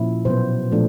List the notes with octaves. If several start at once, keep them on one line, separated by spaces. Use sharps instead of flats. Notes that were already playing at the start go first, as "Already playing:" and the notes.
Already playing: A#2 F3 C#4 E4
B2 F#3 B3 C5
A#2 F3 A3 D4